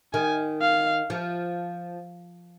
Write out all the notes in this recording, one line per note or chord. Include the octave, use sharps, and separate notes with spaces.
D#3 G#5
F5
F3